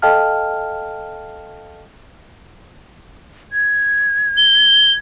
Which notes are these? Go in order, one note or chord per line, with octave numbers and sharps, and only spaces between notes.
A4 D#5 F5 G5 A5 F6
G#6
G7